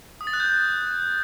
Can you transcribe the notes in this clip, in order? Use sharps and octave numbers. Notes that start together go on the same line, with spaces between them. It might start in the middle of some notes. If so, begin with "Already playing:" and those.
D#6
A6
F#6
G6
F#6